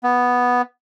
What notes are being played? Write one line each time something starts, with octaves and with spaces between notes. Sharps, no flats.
B3